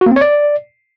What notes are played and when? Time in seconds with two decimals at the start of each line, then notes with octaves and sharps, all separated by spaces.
0.01 F#4
0.06 A#3
0.11 C4
0.16 C#5
0.21 D5